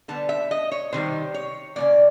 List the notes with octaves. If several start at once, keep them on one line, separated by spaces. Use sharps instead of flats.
D3 G3 B3 A5
E5
D#5
C#5
C3 D#3 G3 C5
C#5
C#3 F3 A#3 D5